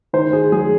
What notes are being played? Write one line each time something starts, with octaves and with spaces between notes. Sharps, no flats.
D#3 C5
G#4
F#3 G#4